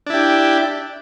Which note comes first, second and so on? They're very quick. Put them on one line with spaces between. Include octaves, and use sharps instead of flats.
D4 E4 G4